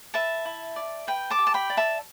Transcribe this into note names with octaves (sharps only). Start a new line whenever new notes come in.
B4 E5 A5
E4
D5
B4 G5
A5 D6
G4
A5
G5 B5
D5
E5 A5